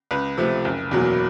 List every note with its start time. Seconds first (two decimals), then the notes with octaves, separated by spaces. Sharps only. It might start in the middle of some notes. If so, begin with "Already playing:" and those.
0.11 C#2 B4
0.37 C3 F3 A3
0.65 F#1
0.91 E2 B2 F#3 A#3